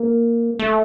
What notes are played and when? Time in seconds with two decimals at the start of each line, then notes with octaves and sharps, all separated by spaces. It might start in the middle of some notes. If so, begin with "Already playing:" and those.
Already playing: A#3
0.59 A3